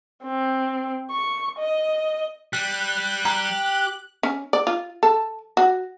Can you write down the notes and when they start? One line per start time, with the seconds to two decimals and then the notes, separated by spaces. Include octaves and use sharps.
0.24 C4
1.11 C#6
1.59 D#5
2.53 G3 F#6
3.25 G4 A#5
4.23 C#4
4.53 D5
4.67 F4
5.03 A4
5.57 F#4